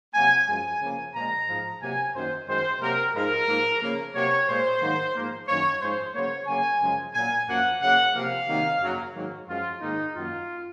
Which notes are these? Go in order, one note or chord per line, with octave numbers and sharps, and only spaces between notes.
C3 F#3 A#3 G#5
F#2 F3 G#3 G#5
C#3 F3 A#3
A#2 F3 G#3 A#5
G#2 F3 G#3
C3 F#3 A#3 G#5
F#2 D#3 A#3 C5
F#2 D#3 G#3 C5
C3 F#3 A#3 A#4
G#2 F3 G#3 A#4
G#2 F3 A#3
C#3 F3 A#3
C3 F#3 A#3 C#5
A#2 G#3 C5
G#2 D#3 F#3 A#3
G#2 F3 A#3
F#2 D#3 A#3 C#5
G#2 F3 G#3 C5
C#3 F#3 A#3 C#5
C#3 F#3 A#3 G#5
F#2 C#3 F3 G#3
A#2 F#3 A#3 G#5
F#2 F3 A#3 F#5
C#3 F#3 A#3 F#5
C3 F3 A#3 F5
C3 D#3 F#3 A#3
F#2 C#3 F#3 A#3
G#2 D#3 F#3 A#3
F#2 F3 G#3 F4
G#2 D#3 A#3 D#4
F#2 D#3 F#3 A#3 F4